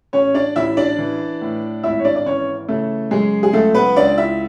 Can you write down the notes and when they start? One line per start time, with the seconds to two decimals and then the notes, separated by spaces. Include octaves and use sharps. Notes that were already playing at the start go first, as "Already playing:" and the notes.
0.13 A1 C#4 C#5
0.34 D4 D5
0.56 A1 E4 E5
0.77 D4 D5
0.98 E3
1.41 A2
1.83 G#1 E4 E5
1.99 C#5
2.05 D4 D5
2.16 D5
2.26 E3 C#4 C#5
2.68 C#3 A3 A4
3.11 F#2 G#3 G#4
3.43 G#4
3.53 C#2 A3 A4
3.75 B3 B4
3.96 C#2 D4 D5
4.18 E4 E5